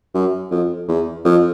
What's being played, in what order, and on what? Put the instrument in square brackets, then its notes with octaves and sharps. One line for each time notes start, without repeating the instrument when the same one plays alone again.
[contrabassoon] F#2
F2
E2
F2